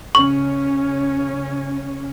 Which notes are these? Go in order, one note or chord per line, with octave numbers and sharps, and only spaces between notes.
C#3 C#4 C#6